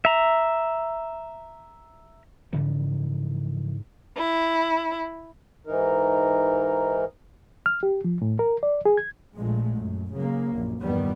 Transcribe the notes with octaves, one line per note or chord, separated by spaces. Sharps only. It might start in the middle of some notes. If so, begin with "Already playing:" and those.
E5 A#5
G#2 C#3 E3 F3
E4
G#2 E3 D#4 A#4
F6
G4
F3
A2
A#4
D5
G#4
G#6
A#1 A#2 G#3 A3
F#2
C#3 F#3 A#3
A#1 F#2
A#1 E2 G2 D#3 G3 B3